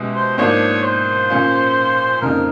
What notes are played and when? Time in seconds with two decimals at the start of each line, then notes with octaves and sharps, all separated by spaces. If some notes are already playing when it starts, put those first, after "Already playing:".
Already playing: B2 G#3 C#4 E4 G4
0.16 C5
0.38 G#2 F3 A#3 D4 C#5
0.84 C5
1.30 A#2 F3 A#3 C#4 F4
2.22 F2 C#3 F3 A#3 D#4 A#4